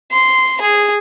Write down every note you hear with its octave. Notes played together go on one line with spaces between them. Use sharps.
C6
G#4